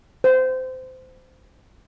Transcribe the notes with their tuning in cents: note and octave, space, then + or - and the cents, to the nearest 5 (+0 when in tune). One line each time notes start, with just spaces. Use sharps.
C5 -20